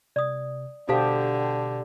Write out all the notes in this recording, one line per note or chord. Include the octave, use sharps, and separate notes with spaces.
C3 D5 D#6
B2 D3 G4 A4 C5 F5 A5